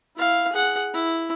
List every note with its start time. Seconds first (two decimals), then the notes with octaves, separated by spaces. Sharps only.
0.17 E4 F5
0.53 G#4 F#5
0.94 E4